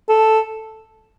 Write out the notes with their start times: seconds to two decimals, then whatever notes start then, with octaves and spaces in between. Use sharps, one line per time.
0.09 A4